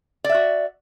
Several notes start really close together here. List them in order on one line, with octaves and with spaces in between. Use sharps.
D5 E5 F#4